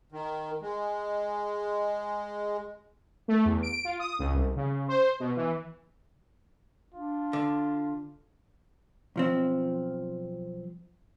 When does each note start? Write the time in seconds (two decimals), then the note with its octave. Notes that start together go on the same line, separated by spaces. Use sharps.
0.12 D#3
0.62 G#3
3.28 A3
3.45 E2
3.63 D7
3.85 F4
3.99 D#6
4.19 C#2
4.34 C2
4.56 C#3
4.88 C5
5.20 B2
5.36 E3
6.94 D4 F4
7.33 D3
9.16 B1 F3 C4